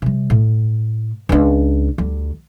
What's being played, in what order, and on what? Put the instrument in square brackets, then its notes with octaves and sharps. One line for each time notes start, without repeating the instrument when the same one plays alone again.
[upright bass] C3 G3
A2
C#2 D4
D2 G3